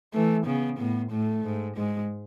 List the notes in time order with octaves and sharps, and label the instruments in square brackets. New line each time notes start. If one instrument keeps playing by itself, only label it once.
[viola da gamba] E3 [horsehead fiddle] A3
[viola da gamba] C#3 [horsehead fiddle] B3
[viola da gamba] A2 [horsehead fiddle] B3
[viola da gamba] A2 [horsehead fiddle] A3
[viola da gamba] G#2
[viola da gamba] G#2 [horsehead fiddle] G#3